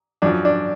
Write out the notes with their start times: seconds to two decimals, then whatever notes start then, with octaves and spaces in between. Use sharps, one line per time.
0.22 F#2 F3 D4
0.45 D4